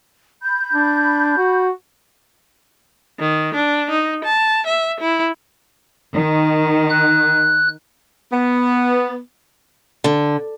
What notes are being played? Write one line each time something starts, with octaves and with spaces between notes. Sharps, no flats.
B5 G6
D4
F#4
D#3
D4
D#4
A5
E5
E4
D#3
F#6
B3
D3